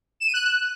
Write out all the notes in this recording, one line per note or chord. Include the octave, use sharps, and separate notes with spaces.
E7
D#7
F#6